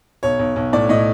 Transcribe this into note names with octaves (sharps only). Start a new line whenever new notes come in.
B1 C#5
B1
B1
A2 D5
A2 D#5